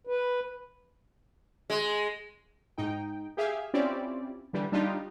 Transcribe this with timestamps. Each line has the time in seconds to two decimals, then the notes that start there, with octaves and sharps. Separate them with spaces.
0.07 B4
1.70 G#3
2.78 G#2 D#4 G5
3.37 G4 G#4 E5 F5 G#5
3.74 C4 C#4 E4 F4 G4 D5
4.53 D3 E3 G3
4.72 G3 D4 D#4 F4 G4